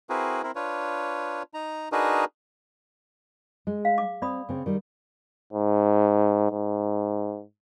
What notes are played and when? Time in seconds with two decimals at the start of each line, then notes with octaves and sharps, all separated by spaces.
0.10 C4 E4 F#4 G#4 A#4 B4
0.43 C4 E4 A#4
0.55 D4 F4 B4 C#5
1.54 D#4 A#5
1.92 D4 D#4 F#4 G#4 A#4 B4
3.67 G#3
3.85 F5
3.98 D6
4.22 C4 D5 B5 D#6
4.49 C#3 C4
4.66 D#3 G3
5.53 G#2
6.51 G#2